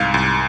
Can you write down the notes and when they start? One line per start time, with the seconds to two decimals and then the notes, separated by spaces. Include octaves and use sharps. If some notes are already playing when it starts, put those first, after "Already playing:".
Already playing: C2 G#2 F5
0.14 C2